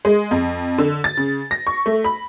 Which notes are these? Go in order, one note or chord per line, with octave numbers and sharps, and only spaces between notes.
G#3
F2
D3
A6
C#3
A#6
C#6
A3
B5